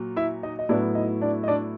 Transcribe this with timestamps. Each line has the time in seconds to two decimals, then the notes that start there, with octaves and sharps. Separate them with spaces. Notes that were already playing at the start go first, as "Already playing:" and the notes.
Already playing: A#2 F#3
0.16 E4 E5
0.43 D#4 D#5
0.59 D#5
0.69 A2 F#3 B3 D4 E4 D5
0.95 D#4 D#5
1.21 D4 D5
1.44 D#5
1.48 D4 D5